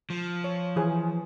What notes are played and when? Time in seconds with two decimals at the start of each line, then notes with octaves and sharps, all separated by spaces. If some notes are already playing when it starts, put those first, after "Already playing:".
0.10 F3
0.44 C#5
0.76 E3 G#4